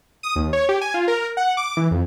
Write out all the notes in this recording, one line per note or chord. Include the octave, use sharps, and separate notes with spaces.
D#6
D#2
C#5
G4
G#5
F4
A#4
F#5
D6
E3
F2